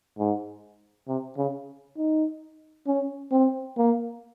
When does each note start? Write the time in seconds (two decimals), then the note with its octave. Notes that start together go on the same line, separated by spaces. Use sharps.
0.18 G#2
1.08 C3
1.37 C#3
1.97 D#4
2.87 C#4
3.31 C4
3.77 A#3